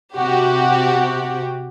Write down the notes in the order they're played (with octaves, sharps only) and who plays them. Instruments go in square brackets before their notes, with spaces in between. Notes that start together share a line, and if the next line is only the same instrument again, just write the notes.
[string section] C3 F#4 G4